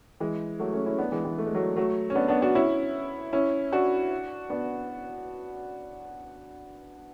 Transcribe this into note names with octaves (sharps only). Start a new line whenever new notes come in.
E3 G#3
F#3 A3
A3 C#4
C#4 E4
B3 D4
E3 G#3
E3 G#3
A3
G#3
F#3 A3
F#3 A3
C#4
B3 D4
B3 D4
D4 F#4
C#4 E4
C#4 E4
D4 F#4
B3 D4